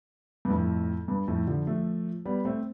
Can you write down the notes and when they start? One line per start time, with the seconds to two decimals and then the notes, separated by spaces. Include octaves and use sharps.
0.45 G2
0.50 F2 A2
1.08 G2
1.28 F2 A2
1.47 D3 F3
1.67 F3 A3
2.26 G3 B3
2.45 A3 C4